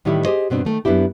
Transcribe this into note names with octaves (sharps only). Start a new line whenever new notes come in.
A2 D#3 E3 G3 E4
G4 G#4 C5 D#5
G2 B2 C4 D4
D#3 A3
F#2 B3 D4 E4 G4